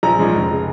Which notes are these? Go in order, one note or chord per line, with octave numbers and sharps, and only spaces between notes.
A#1 A#5
G#2 F3 G#3 C#4
F1
C#3